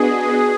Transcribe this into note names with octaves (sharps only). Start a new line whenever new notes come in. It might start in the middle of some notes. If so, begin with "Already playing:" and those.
Already playing: B3 D4 F#4 G#4 B4 D#5